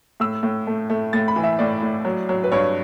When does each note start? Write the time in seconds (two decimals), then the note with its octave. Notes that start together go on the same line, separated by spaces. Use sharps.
0.20 A2 E6
0.43 A2
0.67 A3
0.90 A3
1.13 A2 A6
1.28 B5
1.36 E3
1.43 E5
1.59 A2 D5
1.82 A2
2.05 F#3
2.29 F#3
2.44 B4
2.52 G2 C#5